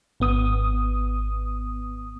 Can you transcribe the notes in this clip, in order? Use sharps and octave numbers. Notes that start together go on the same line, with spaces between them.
G#1 B3 D#6